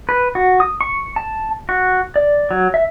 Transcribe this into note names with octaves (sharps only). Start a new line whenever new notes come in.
B4
F#4
D#6
C#6
A5
F#4
D5
F#3
E5